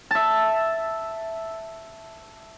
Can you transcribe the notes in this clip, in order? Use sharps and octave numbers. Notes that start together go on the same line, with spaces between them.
E5 A5